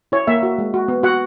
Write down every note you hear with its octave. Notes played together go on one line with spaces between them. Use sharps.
E4 C#5
A#3 E5
F#4
G#3
F#4
B3
F#4 F#5